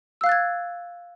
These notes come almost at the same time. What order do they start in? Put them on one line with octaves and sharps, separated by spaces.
E6 F5 F#6 A6 G#6